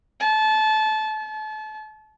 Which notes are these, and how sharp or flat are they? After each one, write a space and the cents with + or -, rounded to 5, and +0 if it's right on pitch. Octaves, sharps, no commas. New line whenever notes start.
A5 -25
A5 -35